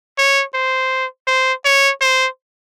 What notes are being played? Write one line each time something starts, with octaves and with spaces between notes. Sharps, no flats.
C#5
C5
C5
C#5
C5